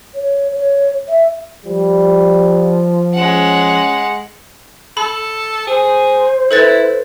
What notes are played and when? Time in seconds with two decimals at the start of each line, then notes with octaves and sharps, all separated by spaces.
0.14 C#5
0.55 C#5
1.08 E5
1.65 F3 G3
3.14 G#3 C#4 F#5
4.97 A4 B5
5.67 G#4 C5
6.51 E4 A4 B4 A6